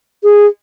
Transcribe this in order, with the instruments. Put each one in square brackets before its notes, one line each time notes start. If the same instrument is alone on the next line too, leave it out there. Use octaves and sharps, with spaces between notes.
[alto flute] G#4